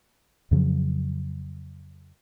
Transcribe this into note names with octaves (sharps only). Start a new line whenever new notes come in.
F2 C#3 F3 F#3